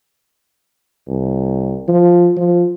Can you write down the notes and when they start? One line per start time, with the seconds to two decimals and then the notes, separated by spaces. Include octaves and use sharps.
1.08 C2
1.88 F3
2.37 F3